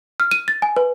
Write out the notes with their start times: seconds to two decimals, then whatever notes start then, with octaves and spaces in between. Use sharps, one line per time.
0.20 F6
0.31 D#7
0.48 A6
0.62 G#5
0.76 B4